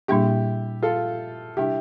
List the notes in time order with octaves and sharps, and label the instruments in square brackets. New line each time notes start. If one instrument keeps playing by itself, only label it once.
[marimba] A#2 G3 A#3 D4 [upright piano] E4 G4
[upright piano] F4 A4
[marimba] C3 G3 D4 [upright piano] E4 G4